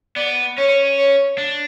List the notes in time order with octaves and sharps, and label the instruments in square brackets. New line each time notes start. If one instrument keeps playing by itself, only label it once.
[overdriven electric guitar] B3 [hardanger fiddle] D5
[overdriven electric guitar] C#4 [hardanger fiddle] C#5
[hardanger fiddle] C#5
[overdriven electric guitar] D4